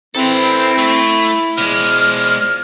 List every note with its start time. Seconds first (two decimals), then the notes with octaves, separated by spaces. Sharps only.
0.15 C4 E4 A4 B4
0.78 A3
1.58 B2 F3 G#3 D5 F6